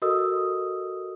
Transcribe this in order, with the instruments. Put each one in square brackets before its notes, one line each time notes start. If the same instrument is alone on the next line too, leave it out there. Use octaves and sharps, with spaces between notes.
[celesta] F#4 A4 A#4 D#5 D#6 E6